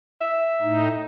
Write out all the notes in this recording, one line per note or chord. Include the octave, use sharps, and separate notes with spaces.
E5
A2 D#4